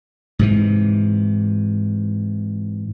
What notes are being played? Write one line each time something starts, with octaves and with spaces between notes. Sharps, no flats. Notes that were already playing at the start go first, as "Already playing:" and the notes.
G#2 C3 E3